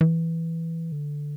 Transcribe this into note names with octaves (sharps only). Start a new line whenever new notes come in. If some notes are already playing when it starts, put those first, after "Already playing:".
E3
D3